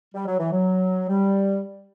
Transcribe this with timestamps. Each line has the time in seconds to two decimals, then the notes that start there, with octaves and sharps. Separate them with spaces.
0.15 G3
0.27 F#3
0.39 E3
0.53 F#3
1.09 G3